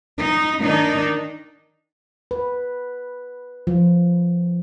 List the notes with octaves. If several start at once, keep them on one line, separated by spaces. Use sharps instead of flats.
D#4
D#3 D4 D#4
B4
F3